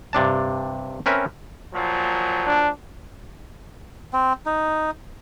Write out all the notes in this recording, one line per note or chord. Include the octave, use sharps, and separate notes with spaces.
G2 C3 D4 A5
C4 C#4 A#4 B4 E5
A#2 F3 F#3
D4
C4
D#4